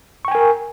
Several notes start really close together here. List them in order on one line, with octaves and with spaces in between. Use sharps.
C#6 G5 G#5 A#4